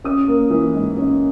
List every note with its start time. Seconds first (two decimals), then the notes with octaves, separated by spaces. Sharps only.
0.04 C#4 D#6
0.28 A#3
0.50 E3
0.74 G#2
0.97 C#4